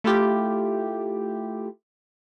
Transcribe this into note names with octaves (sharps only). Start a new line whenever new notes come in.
A3 E4 F4 G4